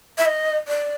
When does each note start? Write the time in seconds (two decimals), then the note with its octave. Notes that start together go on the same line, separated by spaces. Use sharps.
0.18 E5
0.26 D#5
0.68 D5